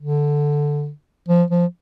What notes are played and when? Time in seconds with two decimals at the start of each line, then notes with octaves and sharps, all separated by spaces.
0.01 D3
1.29 F3
1.50 F3